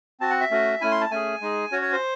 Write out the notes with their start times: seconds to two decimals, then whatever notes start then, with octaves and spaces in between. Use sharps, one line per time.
0.20 C4 F#4 A5
0.30 F#5
0.41 E5
0.51 A3 C#4 F#4
0.81 A3 C#4 E4 G#5
0.91 C6
1.01 A5
1.11 A3 C#4 G#4 G#5
1.41 G#3 D#4 G#4
1.72 C#4 F#4 C#5
1.82 C#5
1.92 C5